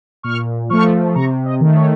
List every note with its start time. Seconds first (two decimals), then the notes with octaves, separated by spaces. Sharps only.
0.23 A#2 C#6 F6
0.70 F3 A3 C#6 F6
1.15 C3 A#5 C#6
1.45 D#5
1.61 D#3 A3
1.76 C#5